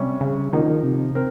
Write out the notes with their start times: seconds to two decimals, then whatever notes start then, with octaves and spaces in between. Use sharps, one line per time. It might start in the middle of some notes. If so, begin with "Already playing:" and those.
Already playing: C3 G3 C#4
0.21 C#3
0.53 D#3 F3 A#3 D#4
0.83 C3
1.15 C4 A#4